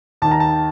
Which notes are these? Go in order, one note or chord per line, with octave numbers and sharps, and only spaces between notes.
D#2 D#3 A5
A#5
A5